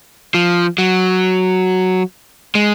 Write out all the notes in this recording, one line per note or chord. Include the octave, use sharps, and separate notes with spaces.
F3
F#3
G#3